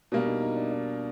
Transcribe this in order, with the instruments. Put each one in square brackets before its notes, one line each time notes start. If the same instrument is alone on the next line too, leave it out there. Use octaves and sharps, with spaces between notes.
[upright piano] B2 G3 A#3 [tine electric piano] D4 D5
[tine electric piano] D#4 D#5
D#4 D#5
D4 D5
D4 D5